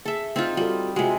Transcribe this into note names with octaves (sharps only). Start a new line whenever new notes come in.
G#4 A4 E5
C4 D#4 F4
G3 F4 F#4 A4
C3 G#3 F4 F#4